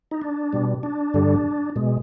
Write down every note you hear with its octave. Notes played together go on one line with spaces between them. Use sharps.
D#4
D4
B2 G3
D4
G2 D3 G3
B2 G#3